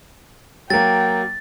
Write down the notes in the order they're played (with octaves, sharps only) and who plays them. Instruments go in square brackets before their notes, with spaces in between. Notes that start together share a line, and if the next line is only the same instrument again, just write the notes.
[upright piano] F#3 A#3 [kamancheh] G5 [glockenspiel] A6